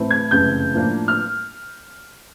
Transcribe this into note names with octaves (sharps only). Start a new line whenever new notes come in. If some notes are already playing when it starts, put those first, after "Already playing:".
Already playing: A2 E3 A3 C4 E4
G#6
F#1 F2 C3 E3 A3 G6
A2 F3 A#3 D4
F6